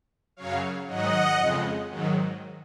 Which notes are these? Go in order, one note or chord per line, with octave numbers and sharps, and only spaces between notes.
F#2 C#3 F#3 C#5 F5
G#2 D#3 F#3 D#5 F#5
F2 C#3 G#3
G#2 D#3 F#3